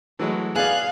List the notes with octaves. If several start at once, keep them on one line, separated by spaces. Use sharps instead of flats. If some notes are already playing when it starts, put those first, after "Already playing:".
E3 F#3 G#3 A3
B3 G#4 D5 F5 F#6